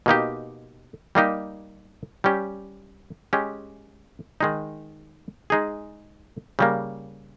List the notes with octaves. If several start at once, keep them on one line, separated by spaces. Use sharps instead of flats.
B2 A#3 D#4 G4
G3 A#3 D#4 G4
G3 C#4 G4
G#3 C#4 G4
D#3 G#3 D#4
G#3 D#4 G#4
C#3 G3 A#3